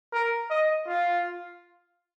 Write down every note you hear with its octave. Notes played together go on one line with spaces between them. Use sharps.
A#4
D#5
F4